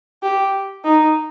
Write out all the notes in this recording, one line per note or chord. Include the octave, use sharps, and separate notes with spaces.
G4
D#4